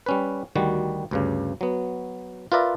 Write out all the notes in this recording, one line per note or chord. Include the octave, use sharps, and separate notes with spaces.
G3 C#4 B4
D2 D#3 G3 F#4
D2 G2 C#3
F#3 B3
F4 A#4 B4 D5 E5 A#5